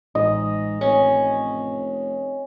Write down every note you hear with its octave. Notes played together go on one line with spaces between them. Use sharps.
A1 G#2 D#5
F1 C#4